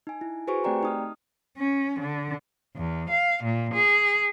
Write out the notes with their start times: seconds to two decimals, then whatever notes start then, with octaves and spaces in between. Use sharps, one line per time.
0.07 D#4 G#5
0.21 E4
0.47 F#4 G#4 B4 C5 G#5 C#6
0.64 A3 C4 G4 D5 G5 A#5
0.83 D#4 D#6 F6
1.58 C#4
2.01 D3
2.76 E2
3.10 F5
3.44 A#2
3.74 G#4